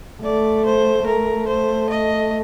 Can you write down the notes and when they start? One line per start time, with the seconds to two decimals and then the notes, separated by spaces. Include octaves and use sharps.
0.23 A3 D5
0.65 C5
1.06 A3 A#4
1.47 C5
1.89 D#5